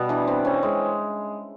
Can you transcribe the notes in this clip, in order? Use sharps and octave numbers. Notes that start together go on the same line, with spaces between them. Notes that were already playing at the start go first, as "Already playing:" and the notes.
Already playing: B2 G3 B3
E3 D4
C4
C4 C#4
G#3